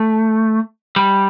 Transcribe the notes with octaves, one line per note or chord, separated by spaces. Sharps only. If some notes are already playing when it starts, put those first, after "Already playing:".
Already playing: A3
G3